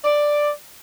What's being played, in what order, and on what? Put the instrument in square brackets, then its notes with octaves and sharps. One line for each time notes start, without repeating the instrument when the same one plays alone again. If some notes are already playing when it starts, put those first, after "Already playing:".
[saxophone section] D5